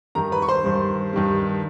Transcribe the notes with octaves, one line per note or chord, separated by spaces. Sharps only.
G2 D#3 G3 A#4 A#5
B4 B5
C#6
C5 C6
G2 D#3 G3
G2 D#3 G3